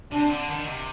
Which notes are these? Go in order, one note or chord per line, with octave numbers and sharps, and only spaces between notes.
C3 D4
D3
D#3
C3